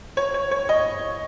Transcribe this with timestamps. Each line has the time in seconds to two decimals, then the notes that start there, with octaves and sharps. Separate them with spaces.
0.17 C#5
0.34 C#5
0.51 C#5
0.69 D#5